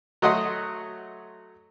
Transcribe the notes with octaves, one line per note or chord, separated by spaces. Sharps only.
F#3 A3 D#5 F#5 C6